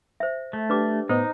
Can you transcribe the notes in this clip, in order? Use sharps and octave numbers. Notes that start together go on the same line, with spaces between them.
C5 E5
A3
D4 G4 B4 D6
A2 B3 D#4 C5 D#5